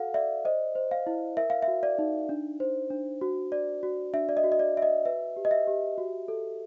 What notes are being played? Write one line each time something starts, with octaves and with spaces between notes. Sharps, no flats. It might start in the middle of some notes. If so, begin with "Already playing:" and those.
Already playing: F#4 A4 F5 F#5
D5 E5
C5 D#5
C5
F5
E4
A#4 E5
F5
E5
F#4
D5
D#4
D4
C5
D4
F#4
D5
F#4
D4 E5
D5
D#5
F#4
D#5
D5
F#4 E5
D#5
B4 E5
G4
D#5
E5
G4
F#4
A4